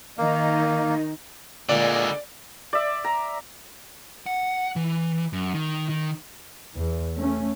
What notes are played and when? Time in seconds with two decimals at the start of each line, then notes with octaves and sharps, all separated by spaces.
0.18 D#3 A#3 D#4
1.69 A#2 D3 G#3 D5
2.73 D5 E5
3.04 A#5
4.26 F#5
4.76 E3
5.33 F#2
5.54 D#3
5.89 D#3
6.76 E2
7.17 A3 C#4